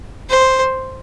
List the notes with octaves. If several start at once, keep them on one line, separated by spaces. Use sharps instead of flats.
C5